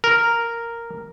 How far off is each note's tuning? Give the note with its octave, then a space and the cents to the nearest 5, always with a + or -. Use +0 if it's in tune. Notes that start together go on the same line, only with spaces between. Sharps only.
A#4 -5